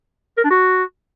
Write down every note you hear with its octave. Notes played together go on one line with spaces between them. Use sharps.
A#4
D4
F#4